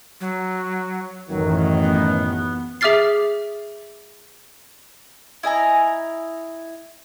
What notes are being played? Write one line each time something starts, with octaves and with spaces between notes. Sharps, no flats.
F#3
A1 F#2 D#3 E3 F#3
B3
G#4 E5 D6 F6 A6 C7
E4 D#5 G#5 A#5